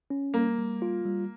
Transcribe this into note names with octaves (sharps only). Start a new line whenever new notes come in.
C#4
G3 A#3
G3
F4
G3